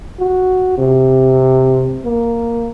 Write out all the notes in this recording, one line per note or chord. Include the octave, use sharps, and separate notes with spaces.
F#4
C3
A#3